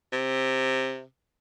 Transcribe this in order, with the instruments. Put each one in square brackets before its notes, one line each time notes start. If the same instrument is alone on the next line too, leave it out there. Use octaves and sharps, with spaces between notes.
[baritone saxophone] C3